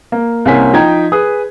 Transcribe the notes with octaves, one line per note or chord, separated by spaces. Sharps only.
A#3
C2 A#3 C4 C#4 G#5 B6
F3 D#4 G5 A#5 G#6
G#4 B4 D#6